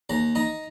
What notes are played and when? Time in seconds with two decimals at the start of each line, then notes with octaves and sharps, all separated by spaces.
0.10 D#2 A#5
0.35 D#4 A#5